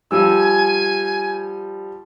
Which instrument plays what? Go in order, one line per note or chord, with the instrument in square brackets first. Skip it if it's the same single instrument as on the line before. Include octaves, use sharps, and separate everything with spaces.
[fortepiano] F3 G3 E6 [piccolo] G#5